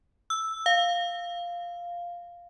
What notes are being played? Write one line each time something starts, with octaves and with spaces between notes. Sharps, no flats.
E6
F5